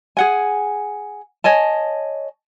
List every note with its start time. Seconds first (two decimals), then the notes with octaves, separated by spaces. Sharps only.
0.17 G#4 F#5 G#5
1.44 C#5 D#5 G#5 A5